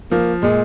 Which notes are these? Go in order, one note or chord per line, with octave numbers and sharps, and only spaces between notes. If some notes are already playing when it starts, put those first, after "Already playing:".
F3 A#3
A#2 G#3